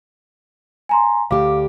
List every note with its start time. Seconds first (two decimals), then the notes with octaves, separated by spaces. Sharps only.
0.89 G#5 A#5 C6
1.31 D2 G4 F5 D6